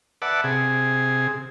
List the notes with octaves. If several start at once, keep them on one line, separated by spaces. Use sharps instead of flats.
B4 D5 E5 F#5 A5
C3 G#4